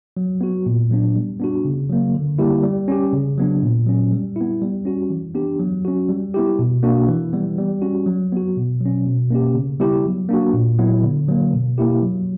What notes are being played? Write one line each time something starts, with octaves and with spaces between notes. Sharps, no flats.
F#3
B3 F#4
A#2
F#3 B3 D4
G3
B3 D4 F#4
C#3
F#3 A#3
D3
G3 A#3 E4 G4
G3
C#4 G4
C#3
F#3 B3 D4
A#2
F#3 C#4
G3
B3 E4
G3
C#4 F#4
E3
B3 D4 G4
F#3
C#4 F#4
G3
B3 E4 G4
B2
A#3 D4 F#4
E3
G3 B3
G3
C#4 F#4
F#3
B3 F#4
B2
F#3 C#4
B2
A#3 C#4 G4
C#3
G3 B3 E4 G4
F#3
A#3 D4 F#4
A#2
F#3 B3 E4
D3
F#3 A#3
B2
A#3 E4 G4
F#3